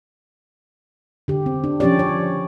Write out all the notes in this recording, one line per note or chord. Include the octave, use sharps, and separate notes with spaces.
D3 G4
C4
D4
F3 C#4 D4 G4 C#5 D5
C#5